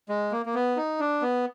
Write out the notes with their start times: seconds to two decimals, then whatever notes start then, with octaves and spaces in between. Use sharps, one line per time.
0.09 G#3
0.32 A#3
0.46 A#3
0.54 B3
0.77 D#4
1.00 D4
1.22 B3